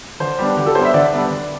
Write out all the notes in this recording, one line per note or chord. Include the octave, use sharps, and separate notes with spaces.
D3 C5
G3 B3 D4 G4
D3 G4
A4
G3 B3 D4 C5
E5
D3 D5
G3 B3 D4
D3